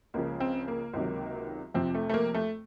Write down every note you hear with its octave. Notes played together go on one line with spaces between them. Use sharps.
C#2 C#3 F3 A#3
C4
A#3
C#2 C3 D#3 F#3
F2 C3 F3 C4
A3
A3
A#3
A3